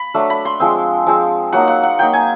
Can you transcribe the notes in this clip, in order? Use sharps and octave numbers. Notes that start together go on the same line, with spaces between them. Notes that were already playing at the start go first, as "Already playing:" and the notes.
Already playing: B5
F#3 A3 D4
B5
C6
F3 G#3 C4
F3 G#3 C4
F#3 A#3 D#4 F#5
F#5
F#5
F#3 A#3 D#4 G5
G#5